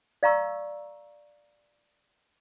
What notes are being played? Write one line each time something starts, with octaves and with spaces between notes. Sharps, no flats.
D5 F5 A#5 C#6 E6